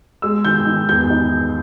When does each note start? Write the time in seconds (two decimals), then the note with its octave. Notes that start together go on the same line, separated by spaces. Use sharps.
0.22 G#3 E6
0.45 D#3 G6
0.67 D#3
0.89 E2 G6
1.10 D#4